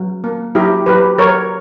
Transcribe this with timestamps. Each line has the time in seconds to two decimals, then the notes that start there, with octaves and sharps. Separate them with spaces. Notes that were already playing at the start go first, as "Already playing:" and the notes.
Already playing: F#3
0.24 A#3
0.55 F#3 E4 G4
0.86 F#3 G4 B4
1.18 F#3 A#4 C#5